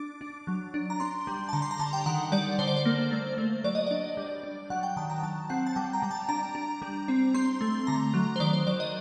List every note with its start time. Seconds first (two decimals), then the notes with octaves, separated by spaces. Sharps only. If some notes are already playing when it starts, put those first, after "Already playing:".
Already playing: D4 D6
0.21 D4
0.47 F#3
0.74 D4
0.90 A#5
1.00 D4 C6
1.27 G3
1.49 A5
1.53 D3 A#5
1.62 C6
1.71 A#5
1.79 D3 A5
1.93 G5
2.06 D#3 F#5
2.32 G3 D5
2.59 D3 C5
2.67 D5
2.76 C5
2.85 A#3
3.11 A3
3.38 A3
3.64 F#3 D5
3.75 D#5
3.87 D4 D5
4.17 G3
4.43 D4
4.70 F#3 F#5
4.83 G5
4.96 D#3 A5
5.10 A#5
5.23 F#3 A5
5.50 C4 F#5
5.67 A5
5.76 G3 G5
5.93 A#5
6.02 G3 G5
6.11 A5
6.29 D4 A#5
6.55 D4
6.82 G3
7.08 C4
7.34 C4 C6
7.61 A3
7.87 D3 A#5
8.14 F#3
8.36 C5
8.40 D#3 D5
8.53 C5
8.67 F#3 D5
8.80 D#5